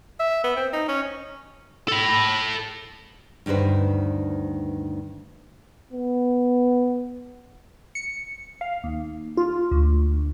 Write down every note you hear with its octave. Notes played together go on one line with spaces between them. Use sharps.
E5
B3
C4
D#4
C#4
A4 B5
D2 G2 D#3 B4 C5
B3
C#7
F5
D#2
F4
D2